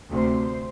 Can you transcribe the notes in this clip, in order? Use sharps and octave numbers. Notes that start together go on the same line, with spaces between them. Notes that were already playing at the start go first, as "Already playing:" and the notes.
D2 C3 A3 C5